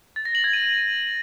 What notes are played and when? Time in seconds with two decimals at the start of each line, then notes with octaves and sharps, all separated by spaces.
0.16 A6
0.25 A#6
0.35 F#7
0.44 G#6
0.53 D#7